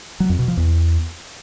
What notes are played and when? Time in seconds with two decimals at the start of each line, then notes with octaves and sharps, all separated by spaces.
0.20 F#3
0.29 F2
0.39 B2
0.48 F3
0.57 E2